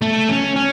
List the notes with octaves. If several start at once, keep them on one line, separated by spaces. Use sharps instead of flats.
A3
C#4
C#4